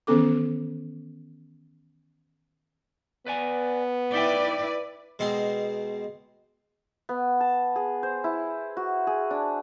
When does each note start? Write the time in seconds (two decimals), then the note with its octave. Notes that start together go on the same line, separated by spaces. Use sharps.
0.07 D#3 E3 B3 C#4 A4 D6
3.27 B3 B4 D5 G#5
4.14 D#4 E4 B4 D5 E5 G5
5.19 B2 G#3 C4 C6
7.09 B3
7.40 A5
7.76 G#4
8.03 C5
8.24 E4
8.77 F#4
9.07 G#4
9.30 D4